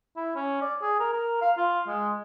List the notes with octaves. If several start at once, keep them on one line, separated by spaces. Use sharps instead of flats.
E4
C#4
D5
G#4
A#4
A#4
F5
F4
G#3